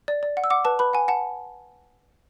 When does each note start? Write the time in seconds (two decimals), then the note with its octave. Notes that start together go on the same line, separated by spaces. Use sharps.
0.08 D5
0.23 D5
0.37 F#5
0.44 E6
0.50 F#5 D6
0.65 B4 A5
0.79 B4 B5
0.93 F#5 G#5
1.08 F#5 A5